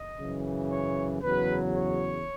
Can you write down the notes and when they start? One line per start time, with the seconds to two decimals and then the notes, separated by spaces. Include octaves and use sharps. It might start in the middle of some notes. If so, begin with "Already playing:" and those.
Already playing: D#5
0.18 F#2 C#3 E3
0.70 C#5
1.21 E2 C#3 F#3 B4
1.74 C#5